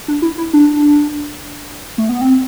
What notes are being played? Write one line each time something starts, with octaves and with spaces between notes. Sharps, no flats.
D4
E4
E4
D4
A3
B3
C4